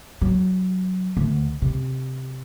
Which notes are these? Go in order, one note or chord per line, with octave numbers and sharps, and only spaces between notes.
F#3
D2
C3